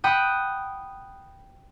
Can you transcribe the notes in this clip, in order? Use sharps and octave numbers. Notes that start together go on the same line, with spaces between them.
F#5 G5 B5 D#6